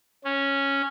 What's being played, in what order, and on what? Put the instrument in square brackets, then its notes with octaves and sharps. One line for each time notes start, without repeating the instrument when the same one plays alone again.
[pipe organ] C#4